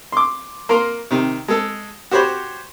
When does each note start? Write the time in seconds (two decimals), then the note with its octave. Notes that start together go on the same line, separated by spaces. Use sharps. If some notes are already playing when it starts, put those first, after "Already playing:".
0.12 C6 D6
0.69 A#3 A#4 C6
1.11 C3 D#3
1.48 G#3 A4
2.11 F#4 G4 C5 C#5 B5